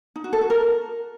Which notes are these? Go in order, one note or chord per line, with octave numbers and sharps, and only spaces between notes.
D#4
F#4
A4
F#4
A#4